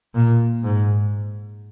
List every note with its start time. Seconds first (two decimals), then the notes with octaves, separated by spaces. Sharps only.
0.15 A#2
0.64 G#2